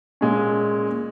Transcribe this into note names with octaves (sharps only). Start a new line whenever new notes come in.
A#2 G#3 C#4